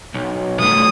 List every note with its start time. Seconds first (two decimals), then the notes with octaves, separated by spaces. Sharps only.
0.14 B1
0.60 F#2 A3 D#6